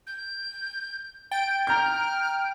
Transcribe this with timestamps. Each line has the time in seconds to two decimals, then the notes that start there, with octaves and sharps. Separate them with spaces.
0.07 G6
1.31 G5 A6 D7
1.67 A#5 F6 G6